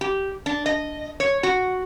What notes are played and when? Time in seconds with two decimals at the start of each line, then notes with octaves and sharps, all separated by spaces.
0.01 G4
0.46 D4
0.66 D#5
1.20 C#5
1.43 F#4